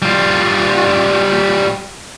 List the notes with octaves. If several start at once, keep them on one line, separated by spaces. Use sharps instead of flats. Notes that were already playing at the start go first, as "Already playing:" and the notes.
G3 F4